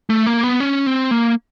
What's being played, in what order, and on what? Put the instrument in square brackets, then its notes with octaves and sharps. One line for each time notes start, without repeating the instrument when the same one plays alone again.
[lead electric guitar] A3
A#3
B3
C#4
C4
A#3